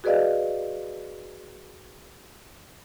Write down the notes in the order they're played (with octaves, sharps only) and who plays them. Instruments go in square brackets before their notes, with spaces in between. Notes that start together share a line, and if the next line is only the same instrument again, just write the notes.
[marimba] F#4 G#4 B4 D5 D#5 F5